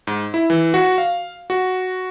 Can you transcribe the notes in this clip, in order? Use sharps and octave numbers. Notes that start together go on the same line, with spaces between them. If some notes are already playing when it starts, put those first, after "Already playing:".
G#2
E4
E3
F#4
F5
F#4